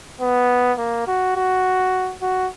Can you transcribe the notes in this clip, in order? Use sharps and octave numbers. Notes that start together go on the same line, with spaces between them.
B3
A#3
F#4
F#4
F#4